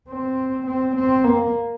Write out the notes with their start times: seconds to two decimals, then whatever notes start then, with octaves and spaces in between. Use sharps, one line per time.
0.09 C4
0.67 C4
0.96 C4
1.24 A#3